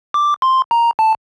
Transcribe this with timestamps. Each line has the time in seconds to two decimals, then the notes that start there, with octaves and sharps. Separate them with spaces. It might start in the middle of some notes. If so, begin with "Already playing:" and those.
0.14 D6
0.42 C6
0.71 A#5
0.99 A5